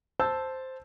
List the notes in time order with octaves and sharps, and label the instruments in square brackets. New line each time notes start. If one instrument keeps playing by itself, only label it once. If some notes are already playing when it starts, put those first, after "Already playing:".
[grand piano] C5 A5 E6 G6